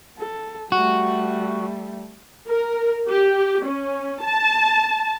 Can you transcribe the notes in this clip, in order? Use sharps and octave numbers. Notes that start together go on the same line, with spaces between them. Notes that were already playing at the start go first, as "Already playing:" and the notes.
A4
G3 A3 F#4
A#4
G4
C#4
A5